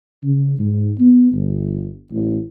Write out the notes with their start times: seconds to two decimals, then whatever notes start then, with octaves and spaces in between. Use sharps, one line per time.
0.23 C#3
0.58 G#2
0.98 B3
1.33 G1
2.11 A1